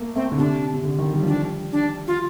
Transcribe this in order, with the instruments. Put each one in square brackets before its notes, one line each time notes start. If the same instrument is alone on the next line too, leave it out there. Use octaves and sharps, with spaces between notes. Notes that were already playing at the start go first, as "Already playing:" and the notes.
Already playing: [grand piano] A3 A#3
[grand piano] A3 [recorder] C4
[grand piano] D3
[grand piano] C3 [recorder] D4
[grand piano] C3
D3
D#3
G3
F3
[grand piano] G3 [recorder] D4
[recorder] D4
F4